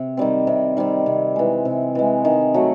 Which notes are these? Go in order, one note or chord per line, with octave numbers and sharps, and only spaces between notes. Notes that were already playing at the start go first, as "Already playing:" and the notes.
Already playing: C3
D#3 G3 C4
C3
D#3 G3 C4
C3
E3 G#3
C3
E3 G#3
D#3
F#3 A3